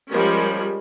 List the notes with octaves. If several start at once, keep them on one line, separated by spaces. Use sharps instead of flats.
F3 G3 G#3 C#4 A#4